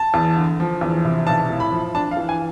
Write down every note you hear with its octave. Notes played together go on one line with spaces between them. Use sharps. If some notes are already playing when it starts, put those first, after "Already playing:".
Already playing: A5
E2
D3
F3
E2
C3
B1 A5
A2
B5
F3
D4 A5
F5
E3
G#5